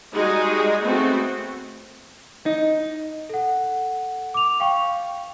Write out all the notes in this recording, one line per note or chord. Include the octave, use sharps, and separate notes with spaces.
G3 G#3 D#4 F#4 G#4
A3 B3 C4 F#4
D#4
A4 F#5
D6 F7
F5 G5 C#6